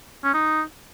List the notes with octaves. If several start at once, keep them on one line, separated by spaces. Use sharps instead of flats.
C#4
D#4